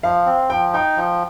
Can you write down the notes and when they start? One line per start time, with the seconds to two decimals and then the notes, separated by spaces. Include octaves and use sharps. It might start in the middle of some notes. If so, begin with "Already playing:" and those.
0.03 F3 F5
0.26 C4
0.50 F3 G5
0.74 D#4 G5
0.97 F3